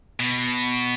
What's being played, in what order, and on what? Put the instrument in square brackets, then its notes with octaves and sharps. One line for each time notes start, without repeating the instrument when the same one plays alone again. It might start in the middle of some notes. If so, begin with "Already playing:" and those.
[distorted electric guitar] B2